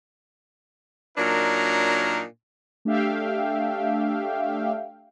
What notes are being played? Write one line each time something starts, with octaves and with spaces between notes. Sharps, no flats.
A#2 F#3 D4 D#4 A#4
A3 D4 G4 E5 F5 G5